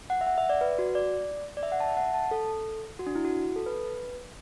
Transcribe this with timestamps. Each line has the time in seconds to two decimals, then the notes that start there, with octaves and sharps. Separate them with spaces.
0.10 F#5
0.21 E5
0.27 F#5
0.38 E5
0.49 D5
0.61 B4
0.79 F#4
0.95 D5
1.57 D5
1.63 E5
1.72 F#5
1.80 A5
1.88 E5
1.97 F#5
2.14 A5
2.31 A4
2.99 F#4
3.07 D4
3.15 E4
3.25 F#4
3.56 A4
3.66 B4